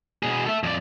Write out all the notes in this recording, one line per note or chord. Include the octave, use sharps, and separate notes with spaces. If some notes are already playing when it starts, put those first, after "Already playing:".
B2 G#4
A4 E5
F2 D5